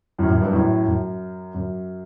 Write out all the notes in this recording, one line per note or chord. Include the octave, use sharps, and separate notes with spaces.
F#2 A2
F#2
G2
F#2 A2
F#2
F#2